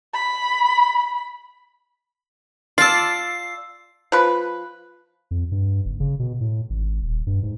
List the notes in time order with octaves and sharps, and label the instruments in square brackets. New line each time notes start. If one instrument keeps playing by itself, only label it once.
[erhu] B5
[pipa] F4 [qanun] D5 A5 [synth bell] E6 C7
[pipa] F3 B4
[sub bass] F2
G2
F#1
C#3
B2
A2
G#1
D#1
G2
G#2